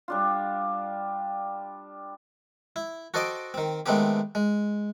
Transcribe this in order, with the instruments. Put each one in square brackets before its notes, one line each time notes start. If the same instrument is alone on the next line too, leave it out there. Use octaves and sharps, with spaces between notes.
[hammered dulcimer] G3 D4 F4
[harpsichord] E4
F#4 A4 C5 D#5 G5 D6
D#3 C4
D#3 G#3 A3 B3 C4 G4
G#3